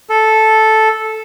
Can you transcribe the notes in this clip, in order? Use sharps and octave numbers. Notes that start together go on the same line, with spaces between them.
A4